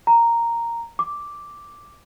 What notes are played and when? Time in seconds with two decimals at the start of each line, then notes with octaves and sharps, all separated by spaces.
0.07 A#5
0.99 D6